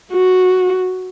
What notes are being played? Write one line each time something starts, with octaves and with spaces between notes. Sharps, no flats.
F#4